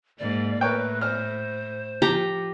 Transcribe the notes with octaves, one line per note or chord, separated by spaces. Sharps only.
G#2 A#3 D5
A2 A#4 B4 C#5 G5
C5 F6
F3 G4 A#5